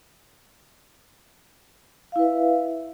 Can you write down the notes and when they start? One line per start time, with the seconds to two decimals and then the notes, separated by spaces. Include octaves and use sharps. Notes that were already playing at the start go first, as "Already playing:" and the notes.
2.12 F5
2.16 E4
2.19 B4
2.22 E5